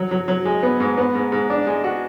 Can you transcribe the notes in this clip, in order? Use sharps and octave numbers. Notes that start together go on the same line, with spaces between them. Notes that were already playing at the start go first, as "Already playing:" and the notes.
Already playing: F#3
F#3
F#3
G#3
B3
G#2
B3
G#2
G#2
D4
G#3
F#4